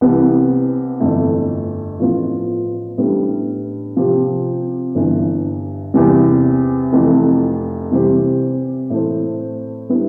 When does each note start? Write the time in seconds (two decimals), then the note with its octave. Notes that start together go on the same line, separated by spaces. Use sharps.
0.01 C2 C3 E3 B3
1.00 G1 F2 E3 A3 E4
1.99 A1 A2 F3 B3 F4
2.98 A1 A2 G3 B3 D4
3.96 C3 F3 C4 G4
4.95 G1 G2 E3
5.94 E2 C3 E3 G3
6.92 F1 F2 E3
7.91 C3 E3 G3 C4 G4
8.90 A2 E3 A3 C4
9.89 D3 G3 B3 E4